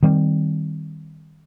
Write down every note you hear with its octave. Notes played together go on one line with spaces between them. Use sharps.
D#3 G3 C4